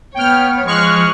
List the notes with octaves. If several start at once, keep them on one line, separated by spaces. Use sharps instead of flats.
B3 C#5 G5 F6
F3 G#3 C#6 F6 F#6